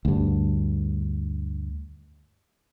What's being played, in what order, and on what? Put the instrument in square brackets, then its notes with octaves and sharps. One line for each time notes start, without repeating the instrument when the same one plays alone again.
[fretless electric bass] D2 G2